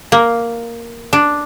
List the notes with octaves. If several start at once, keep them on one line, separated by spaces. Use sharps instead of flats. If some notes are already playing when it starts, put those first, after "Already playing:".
A#3
D4